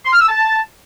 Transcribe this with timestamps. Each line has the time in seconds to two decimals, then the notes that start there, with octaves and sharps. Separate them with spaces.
0.06 C6
0.13 F6
0.21 E6
0.28 A5